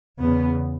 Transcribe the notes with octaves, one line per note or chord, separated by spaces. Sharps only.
E2 C#3 B3